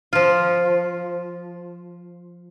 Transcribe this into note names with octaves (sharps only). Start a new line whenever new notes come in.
F3 F4